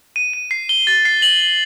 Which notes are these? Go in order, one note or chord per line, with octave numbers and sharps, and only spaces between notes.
D#7
D#7
C7
G7
A6
C7
F#7
F#7